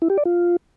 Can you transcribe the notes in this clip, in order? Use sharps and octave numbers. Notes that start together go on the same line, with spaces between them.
E4
G4
D5
F4